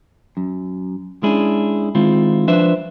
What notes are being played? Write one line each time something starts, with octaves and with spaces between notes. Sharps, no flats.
F#2
G#3 C#4 D4 E4 G#4
D#3 G#3 C4 E4 F4
F3 D4 B4 C5 E5